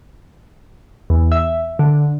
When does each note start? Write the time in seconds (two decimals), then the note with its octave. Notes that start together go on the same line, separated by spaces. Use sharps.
1.10 E2
1.32 E5
1.79 D3